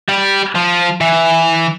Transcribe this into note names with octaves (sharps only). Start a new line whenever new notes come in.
G3
F3
E3